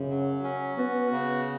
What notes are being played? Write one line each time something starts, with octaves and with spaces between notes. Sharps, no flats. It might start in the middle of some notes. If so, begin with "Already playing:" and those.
Already playing: F#2 C#3
F#3
C#4
B3 F#4
C#3